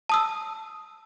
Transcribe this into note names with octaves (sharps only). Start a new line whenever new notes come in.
A5 D#6 E6